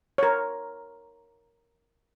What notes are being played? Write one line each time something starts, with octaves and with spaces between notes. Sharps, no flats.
A#4 C#5